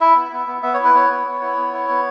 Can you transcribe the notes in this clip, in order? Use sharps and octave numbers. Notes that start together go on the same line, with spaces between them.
E4 E5
B3
B3
B3
B3 E5
C#5
E4
B4
B3 C#5
B3
B3
E4
B3
E4
B3